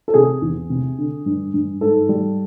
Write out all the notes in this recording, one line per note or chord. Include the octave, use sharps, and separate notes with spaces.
A4
C3 G#4
E2
C3
D3
G2
G2
G#2 A4
G3